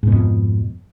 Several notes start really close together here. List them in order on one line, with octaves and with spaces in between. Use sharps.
G#2 B2 F2